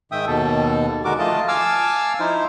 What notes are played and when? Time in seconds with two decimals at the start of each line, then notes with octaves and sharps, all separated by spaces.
0.12 G#2 D#3 E5 G5 D#6
0.27 D#2 B2 A4
1.05 D3 G#3 F#4 A#4 D6
1.19 F3 A3 F4 D#5 A5
1.48 F5 G#5 A5 D6 E6 F6
2.20 F3 D#4 E4 C5